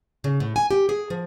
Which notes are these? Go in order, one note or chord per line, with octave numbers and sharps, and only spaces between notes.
C#3
A2
G#5
G4
G#4
F3